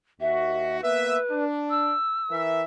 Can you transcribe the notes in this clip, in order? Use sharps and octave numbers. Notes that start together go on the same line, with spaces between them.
D#2 F#4 E5
A#3 B3 B4 E5
D4
E6
E3 A#4 E5